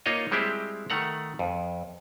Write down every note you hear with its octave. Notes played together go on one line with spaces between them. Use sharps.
A#3 D#4 F4 C#5 D#5
G3 G#3 C4 E4 G4
D#3 A3 F#5 A#5
F2